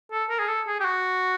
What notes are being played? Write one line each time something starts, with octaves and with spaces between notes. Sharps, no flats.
A4
A#4
G#4
A4
G#4
G4
F#4